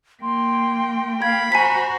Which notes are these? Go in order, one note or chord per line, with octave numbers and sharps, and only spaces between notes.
A#3 G5 C6
F5 B5 G#6
F#4 C5 G#5 A#5 B6